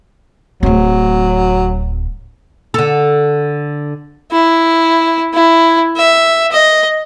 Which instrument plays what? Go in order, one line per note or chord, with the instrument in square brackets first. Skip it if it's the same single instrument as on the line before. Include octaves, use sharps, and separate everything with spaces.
[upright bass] D1 C4 [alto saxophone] F#3
[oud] D3 A4
[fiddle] E4
E4
E5
D#5